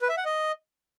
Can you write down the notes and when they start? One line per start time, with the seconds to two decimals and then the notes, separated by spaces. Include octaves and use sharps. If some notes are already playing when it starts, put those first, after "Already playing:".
0.01 B4
0.09 E5
0.17 F#5
0.25 D#5